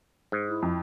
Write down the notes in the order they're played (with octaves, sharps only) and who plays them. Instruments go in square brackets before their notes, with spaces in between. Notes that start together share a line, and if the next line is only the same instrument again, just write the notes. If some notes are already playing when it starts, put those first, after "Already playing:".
[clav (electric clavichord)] G#2
[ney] E4
[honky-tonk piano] F2